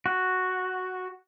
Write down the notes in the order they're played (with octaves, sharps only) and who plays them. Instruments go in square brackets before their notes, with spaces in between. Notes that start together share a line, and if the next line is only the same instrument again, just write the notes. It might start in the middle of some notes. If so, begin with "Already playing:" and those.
[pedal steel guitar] F#4